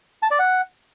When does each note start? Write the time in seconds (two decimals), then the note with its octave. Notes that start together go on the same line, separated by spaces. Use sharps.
0.22 A5
0.31 D5
0.39 F#5